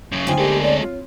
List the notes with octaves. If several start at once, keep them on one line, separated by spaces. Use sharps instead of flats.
F#2 C#3
D2 D#4 F4 C5 G5 G#5
G#3 B3 G4 A4 A#4 D5
C4 C#5 D5
F4